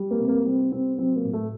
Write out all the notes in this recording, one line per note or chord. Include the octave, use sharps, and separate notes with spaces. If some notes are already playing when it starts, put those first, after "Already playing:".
Already playing: G3
A#3
C3
A#3
G3 C4
C3 C4
F#3 C4
A#3
A2
A3